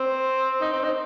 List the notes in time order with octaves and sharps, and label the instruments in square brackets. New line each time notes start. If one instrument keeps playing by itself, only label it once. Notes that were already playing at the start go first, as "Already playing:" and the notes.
Already playing: [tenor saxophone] C4
D#4
C4
D#4